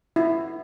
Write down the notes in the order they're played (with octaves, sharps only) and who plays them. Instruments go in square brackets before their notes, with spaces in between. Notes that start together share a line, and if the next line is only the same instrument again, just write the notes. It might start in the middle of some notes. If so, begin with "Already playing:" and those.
[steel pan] E4